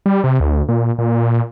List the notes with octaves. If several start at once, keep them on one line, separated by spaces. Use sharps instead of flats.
G3
C3
D2
A#2
A#2